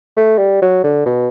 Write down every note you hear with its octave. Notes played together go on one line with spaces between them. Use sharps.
A3
G3
F#3
D3
B2